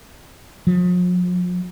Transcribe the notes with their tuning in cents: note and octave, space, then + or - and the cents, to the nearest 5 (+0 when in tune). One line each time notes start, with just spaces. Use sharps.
F3 +45